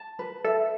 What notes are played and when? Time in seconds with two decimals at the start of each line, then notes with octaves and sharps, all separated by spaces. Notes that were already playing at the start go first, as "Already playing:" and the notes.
Already playing: A5
0.19 B4
0.44 A4 E5